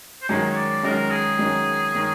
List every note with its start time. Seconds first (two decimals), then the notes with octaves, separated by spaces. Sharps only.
0.22 C5
0.29 F#2 D#3 G#3 C#4 C#5
0.51 C#5
0.56 D5
0.83 F#2 D#3 G#3 C#4 A#4
1.11 G#4
1.39 F#2 D#3 G#3 C#4
1.93 D#3 G#3 C#4